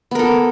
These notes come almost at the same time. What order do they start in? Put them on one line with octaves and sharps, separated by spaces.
B3 A#4 A4